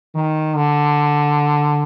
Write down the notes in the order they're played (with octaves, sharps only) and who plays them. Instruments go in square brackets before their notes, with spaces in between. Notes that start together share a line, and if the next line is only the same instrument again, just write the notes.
[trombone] D#3
D3